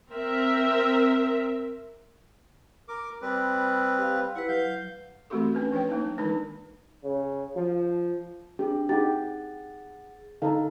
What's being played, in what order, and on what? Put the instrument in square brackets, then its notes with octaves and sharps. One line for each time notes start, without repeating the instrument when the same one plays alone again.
[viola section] C4 A#4 E5
[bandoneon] A#4 D6
G3 C4 B4
[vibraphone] G4 F5
[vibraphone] E4 B4 [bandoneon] F#5
[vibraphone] F#3 [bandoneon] F5 G6
[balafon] E3 A3 C4 F#4 G4 A4
C#4 D4 B4
F3 B4 C#5 G5
F#3 A#3 D4 D#4
D#3 E3 G#3 D4 D#4 B4
[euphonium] C#3
F3
[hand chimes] D4 G#4 [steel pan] G4
[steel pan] D#4 G4 [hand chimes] G#4 F#5 A6
[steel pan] D3 D#4 A4 [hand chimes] F5 A#5